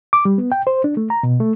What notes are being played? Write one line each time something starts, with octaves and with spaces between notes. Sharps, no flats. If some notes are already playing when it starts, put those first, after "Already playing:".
D6
G3
B3
G5
C5
D4
A3
A#5
B2
A3